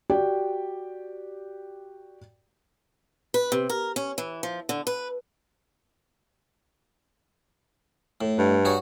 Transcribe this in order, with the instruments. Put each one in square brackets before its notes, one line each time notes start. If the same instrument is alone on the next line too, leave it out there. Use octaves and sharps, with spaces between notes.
[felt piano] F#4 G4 D5 G5
[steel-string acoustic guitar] B4
C3
A#4
C#4
E3
F3
D3
B4
[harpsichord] A2
[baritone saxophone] G2
[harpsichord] F#4 G#4 C#5